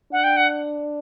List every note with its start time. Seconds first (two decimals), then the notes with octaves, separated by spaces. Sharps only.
0.12 D4 F#5
0.24 G5
0.37 F#5